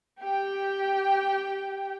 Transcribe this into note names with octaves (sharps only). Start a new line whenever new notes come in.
G4 G5